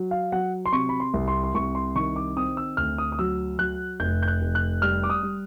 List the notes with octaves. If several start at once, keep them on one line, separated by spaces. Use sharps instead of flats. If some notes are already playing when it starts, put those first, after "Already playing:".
Already playing: F#3
F5
F#3 F#5
C6
C3 C#6
B5
C6
C2
C6
C6
C2 C#6
C6
D#3 C#6
D6
C4 D#6
E6
D2 F6
D#6
D#6
F#3 E6
F#3 F#6
F1 G6
G6
F#6
F1
F#6
G3 F6
D6
D#6
G3